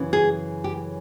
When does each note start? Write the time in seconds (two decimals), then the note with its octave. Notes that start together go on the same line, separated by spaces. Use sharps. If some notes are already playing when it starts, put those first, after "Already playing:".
Already playing: F#2 C#3 E3
0.13 G#4
0.64 G4